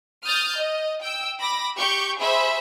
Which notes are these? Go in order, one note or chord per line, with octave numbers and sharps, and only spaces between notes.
D#6 F6 G6 A6
D#5
G5 E6
B5 D6 A#6
G4 C#6 G6
G#4 C5 E5 B5